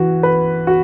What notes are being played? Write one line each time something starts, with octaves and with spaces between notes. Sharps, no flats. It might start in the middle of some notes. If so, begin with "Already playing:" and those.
Already playing: E3 F#4
B4
F#4